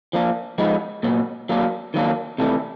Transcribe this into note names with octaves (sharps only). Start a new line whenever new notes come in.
F3 A#3 D4
F3 G#3 B3 D#4
A#2 F#3 B3
F#3 A#3 D4
D#3 F#3 A#3 D4
C3 E3 A3 D4